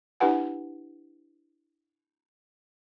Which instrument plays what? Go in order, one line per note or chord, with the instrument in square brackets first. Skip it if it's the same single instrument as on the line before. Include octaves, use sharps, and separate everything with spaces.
[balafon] D4 E4 G4 B4 F#5 G#5